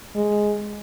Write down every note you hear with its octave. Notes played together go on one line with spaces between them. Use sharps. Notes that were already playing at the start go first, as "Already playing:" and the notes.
G#3